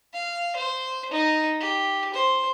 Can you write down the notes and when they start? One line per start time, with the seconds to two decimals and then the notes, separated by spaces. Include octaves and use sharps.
0.14 F5
0.56 C5
1.11 D#4
1.60 G4
2.14 C5